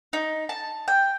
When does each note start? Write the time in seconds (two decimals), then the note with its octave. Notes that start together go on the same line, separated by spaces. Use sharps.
0.13 D#4
0.49 A5
0.88 G5